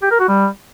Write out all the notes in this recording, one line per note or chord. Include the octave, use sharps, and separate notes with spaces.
G4
A#4
F#4
G3